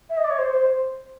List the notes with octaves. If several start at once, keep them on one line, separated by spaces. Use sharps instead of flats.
E5
D#5
D5
C#5
C5
C5